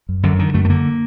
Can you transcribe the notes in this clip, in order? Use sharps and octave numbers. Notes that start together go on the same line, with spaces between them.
F#2
F#2 D3
D3 D#3
F#2 A3
A3
D3 A#3